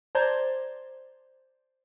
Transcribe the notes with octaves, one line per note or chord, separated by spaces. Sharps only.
C5 D5 A5 A#5 G6 G#6